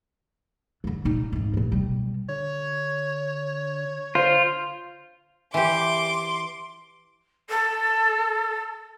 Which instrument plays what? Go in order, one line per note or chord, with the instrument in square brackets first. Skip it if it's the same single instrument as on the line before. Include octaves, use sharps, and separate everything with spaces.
[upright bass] D3 E3
A#2 D#4
G#1 G#2
G2 A#2
B2 G3
[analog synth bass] D3 [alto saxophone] C#5
[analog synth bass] D3 [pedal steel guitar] F4 [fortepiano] C5
[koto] E3 G4 [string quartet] C6 D6
[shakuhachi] A4